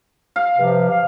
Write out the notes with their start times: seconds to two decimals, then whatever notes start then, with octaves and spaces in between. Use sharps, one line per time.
0.36 F5
0.58 G2 C3 F3
0.91 F5